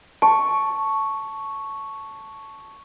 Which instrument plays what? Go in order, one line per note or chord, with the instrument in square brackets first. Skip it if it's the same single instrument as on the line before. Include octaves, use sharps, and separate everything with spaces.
[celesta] A5 [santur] C#6